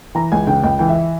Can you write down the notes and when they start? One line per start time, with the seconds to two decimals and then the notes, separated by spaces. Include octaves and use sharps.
0.15 E3 A#5
0.32 C#2 G#5
0.47 C#3 G5
0.63 C#2 G5
0.79 E3 G5
0.89 E5